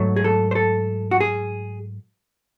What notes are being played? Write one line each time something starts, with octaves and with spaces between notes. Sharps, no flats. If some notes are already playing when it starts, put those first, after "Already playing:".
Already playing: G#2 F#3 A3
G#4
A4
C5
A4
F#4
G#4